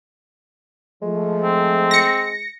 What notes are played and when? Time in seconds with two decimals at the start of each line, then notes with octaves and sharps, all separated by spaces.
1.02 F3 G#3 A3
1.43 C4
1.91 A#6 C#7